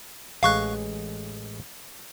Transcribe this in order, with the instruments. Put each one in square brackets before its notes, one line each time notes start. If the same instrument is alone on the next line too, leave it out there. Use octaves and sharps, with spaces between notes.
[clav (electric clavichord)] A1 G#3 [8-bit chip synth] F5 C#6 F#6